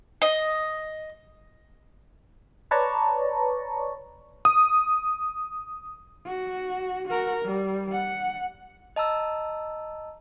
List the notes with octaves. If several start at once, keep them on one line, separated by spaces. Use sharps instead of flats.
D#5
B4 C#5 D5 A5 A#5 C#6
D#6
F#4
F#4 A#4
G3
F#5
D#5 A5 A#5 E6